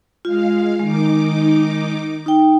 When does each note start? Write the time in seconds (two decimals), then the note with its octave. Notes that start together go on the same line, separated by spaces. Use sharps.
0.25 G#3 F4 F5
0.79 D#3 G#3 D#4 D6
2.26 D#4 G5